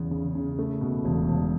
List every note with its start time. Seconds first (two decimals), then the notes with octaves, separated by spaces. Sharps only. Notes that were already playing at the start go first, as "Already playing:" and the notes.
Already playing: E2 C#3
0.11 C#3
0.35 C#3
0.59 A3
0.81 B2
1.05 E1
1.29 E1